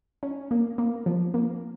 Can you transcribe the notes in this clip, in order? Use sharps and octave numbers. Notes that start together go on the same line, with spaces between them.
C#4
A#3
A#3
F3
A#3